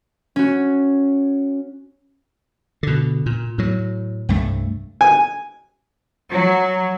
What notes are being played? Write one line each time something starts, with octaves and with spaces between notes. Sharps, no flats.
C#4 F#4
B2 D3
A#2
A2 F#3
C2 G2 A3
G#5
F#3